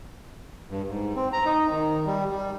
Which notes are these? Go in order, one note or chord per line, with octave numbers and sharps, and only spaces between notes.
G2
G#2
C4
A#5
D#4
D#3
G3
G3